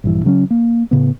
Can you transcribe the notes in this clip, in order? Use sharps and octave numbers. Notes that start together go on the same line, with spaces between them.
A#1 G2 E3
C#3 F#3 A#3 C#4
A#3
A2 C#3 B3